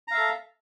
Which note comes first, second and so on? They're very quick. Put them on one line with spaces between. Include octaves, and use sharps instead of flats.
A#5 F5 E5 A4